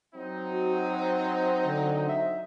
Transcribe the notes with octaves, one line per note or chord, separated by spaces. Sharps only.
F#3 C4 D#4
F#4
C5
D3
E5